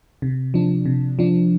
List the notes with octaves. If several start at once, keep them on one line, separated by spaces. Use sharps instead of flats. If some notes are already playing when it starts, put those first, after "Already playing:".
C3
F3 D4
C3
F3 D4